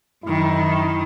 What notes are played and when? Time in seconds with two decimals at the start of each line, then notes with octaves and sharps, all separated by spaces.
0.24 F#2 D#3 E4